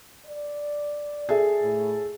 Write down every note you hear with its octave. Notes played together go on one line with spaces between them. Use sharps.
D5
G#4 A4 E5
A2